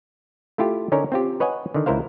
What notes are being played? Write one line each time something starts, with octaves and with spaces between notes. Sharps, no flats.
A3 E4 F4 G4
D3 C#4 D#4 A#4 C#5
C4 F4 G4
B4 C#5 D#5 F#5 G#5
D3 D#3
C#2 E4 A#4 C5 F5